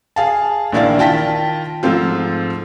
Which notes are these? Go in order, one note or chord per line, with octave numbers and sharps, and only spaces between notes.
G#4 F5 A5
A#1 D#3 D4 E4 D5 F5
D#3 F4 G5 A5 A#6 B6
G#2 F3 A3 C4 F4